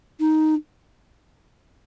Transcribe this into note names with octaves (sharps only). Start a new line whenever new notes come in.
D#4